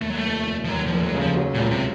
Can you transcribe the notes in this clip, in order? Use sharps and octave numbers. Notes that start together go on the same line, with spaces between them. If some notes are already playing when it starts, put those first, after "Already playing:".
D#2 A3
F#3
A3
F1
F1
F3
D#2 F#3
F3
F1
F#3
C#3
F3
F#3
A#2
C#2
C3